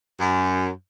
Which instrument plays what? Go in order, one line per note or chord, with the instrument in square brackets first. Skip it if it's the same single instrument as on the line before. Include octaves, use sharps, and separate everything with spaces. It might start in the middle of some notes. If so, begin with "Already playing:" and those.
[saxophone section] F#2